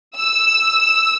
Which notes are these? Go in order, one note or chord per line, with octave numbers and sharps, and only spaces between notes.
E6